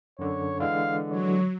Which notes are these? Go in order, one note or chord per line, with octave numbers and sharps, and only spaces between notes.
F#2 D3 C#5
D3 E3 G#3 F5
F#3 C#5